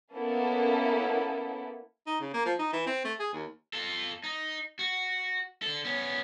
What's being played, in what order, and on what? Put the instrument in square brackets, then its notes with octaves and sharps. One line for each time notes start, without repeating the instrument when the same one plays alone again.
[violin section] A#3 B3 C#4 E4 A4
[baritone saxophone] D#4
C#3
A#3
F3
D#4
E3
C4
A3
G#4
D#2
[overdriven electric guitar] F4 A4
D#4
F#4
D3 A4
B3 C#4